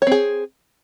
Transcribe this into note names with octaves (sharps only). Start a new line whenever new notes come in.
C4 G#4 C#5